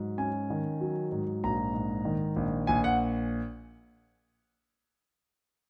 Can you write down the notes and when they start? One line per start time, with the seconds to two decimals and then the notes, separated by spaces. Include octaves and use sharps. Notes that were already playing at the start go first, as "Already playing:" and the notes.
Already playing: G#2 F#3
0.18 C#4 G#5
0.50 D#3
0.81 F#3
1.12 G#2
1.43 A#1 A#5
1.74 G#2
2.05 D#3
2.36 A#1
2.67 A#1 G#5
2.84 F#5